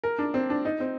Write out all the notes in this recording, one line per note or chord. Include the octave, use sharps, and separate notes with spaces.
A#4
D4
C4
D4
D#4
C4